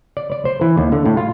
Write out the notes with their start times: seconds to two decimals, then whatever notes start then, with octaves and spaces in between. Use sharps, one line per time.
0.17 D5
0.32 D5
0.45 C5
0.61 E3
0.77 D#2
0.92 D3
1.06 A2
1.17 F4